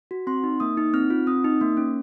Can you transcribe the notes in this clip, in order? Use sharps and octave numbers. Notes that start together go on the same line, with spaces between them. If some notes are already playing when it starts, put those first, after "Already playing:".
F#4
C4 C6
D#4
A#3 D#6
D#4
C4 F6
F4
C4 D#6
D#4
A#3
C#4